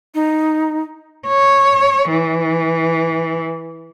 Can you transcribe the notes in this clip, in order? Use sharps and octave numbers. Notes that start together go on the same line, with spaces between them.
D#4
C#5
E3